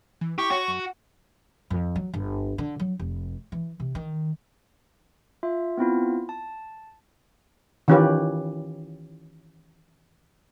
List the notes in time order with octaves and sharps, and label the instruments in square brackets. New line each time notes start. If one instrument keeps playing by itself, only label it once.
[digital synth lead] E3
[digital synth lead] E4 [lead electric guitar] G4 [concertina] C#6
[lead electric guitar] F#4 [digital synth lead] C#5
[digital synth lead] F#2
F#5
[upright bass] F2
F#3
G1
D3
F#3
F1
E3
C3
D#3
[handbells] F4 E5
B3 C4 E4 F4
A5
[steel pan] D#3 E3 C#4 F4 G4 B4